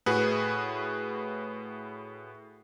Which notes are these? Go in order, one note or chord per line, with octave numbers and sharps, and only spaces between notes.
A2 F#4 G#4 B4